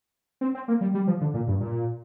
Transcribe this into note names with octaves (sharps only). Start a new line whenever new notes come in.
C4
C4
A#3
G3
G3
F3
D3
A#2
G2
A#2